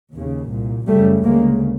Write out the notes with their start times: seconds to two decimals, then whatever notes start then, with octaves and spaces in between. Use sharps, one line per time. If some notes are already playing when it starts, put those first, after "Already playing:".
0.14 D#2 C#3
0.50 C2 A#2
0.87 F#2 C#3 G3 A3
1.24 D2 C#3 G#3 A#3